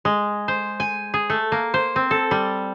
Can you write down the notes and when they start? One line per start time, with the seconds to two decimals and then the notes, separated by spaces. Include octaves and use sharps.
0.05 G#3
0.48 C5
0.80 G#5
1.14 G#4
1.30 A3
1.52 A#3
1.74 C5
1.96 C4
2.11 A4
2.31 G3